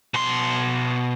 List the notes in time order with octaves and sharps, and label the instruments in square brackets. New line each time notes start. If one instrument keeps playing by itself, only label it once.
[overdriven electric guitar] B2 C6